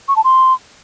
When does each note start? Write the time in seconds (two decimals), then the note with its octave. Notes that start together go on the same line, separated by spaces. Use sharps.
0.08 C#6
0.16 A5
0.24 C6